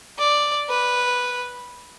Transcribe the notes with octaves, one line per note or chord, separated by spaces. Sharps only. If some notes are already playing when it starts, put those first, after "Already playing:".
D5
B4